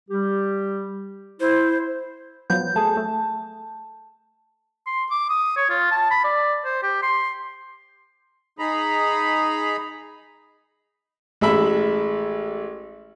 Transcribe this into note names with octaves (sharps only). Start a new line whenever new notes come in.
G3 G4
E4 C5
F3 F#3 B3 G6
A3 G#4 A5
A3
C6
D6
D#6
C#5
F4
A5
B5
D5
C5
G4
C6
D#4 G#4 A#5 B5
A1 G#3 E5 B5